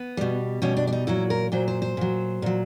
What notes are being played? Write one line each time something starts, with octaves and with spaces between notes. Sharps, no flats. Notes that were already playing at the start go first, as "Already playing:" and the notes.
Already playing: B3
B2 G3
B2 G3 C#4
D4
D4
D#4
A#2 F#3 E4
A#4
A#2 F#3 C5
C5
C5
A#2 F#3
A#2 F#3